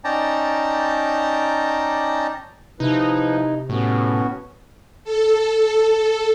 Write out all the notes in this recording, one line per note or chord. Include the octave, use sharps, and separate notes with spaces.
C#4 D#4 D5 G5 A5 A#5
C3 F3 D#4 E4 B4
A2 B3 C#4 F#4
A4